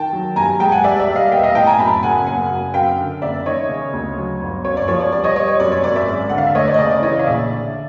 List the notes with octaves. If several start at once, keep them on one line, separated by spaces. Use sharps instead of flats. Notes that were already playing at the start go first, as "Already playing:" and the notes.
Already playing: D#3 G5 A5
F#3
G2 G#5 A#5
G#3 G5 A5
F#5 G#5
G3 D5 E5
D5 E5
G3
D#5 F5
B3 F5 G5
E5
D#5 F5
A2 G5 A5
G#5 A#5
F#2 A5 B5
A5
C#3 F#5 G#5
F#1 F#5 G#5
F#2
F#2 F5 G5
D3
F#1 D5 E5
D#3 C#5 D#5
C#3
D2
F#3
G1
F#2 C#5
D5
F3 C#5
D5
G3 D5
C#5 D#5
G3 C#5 D#5
C#5
F#2 D5
C#5
G#1 D5
D5 E5
G#3
D3 F#5
F5
E5
A3 C#5 D#5
D5
D#5
C#3 D5
D5
E3 C#5 D#5
F5
A#1 D5 E5
D3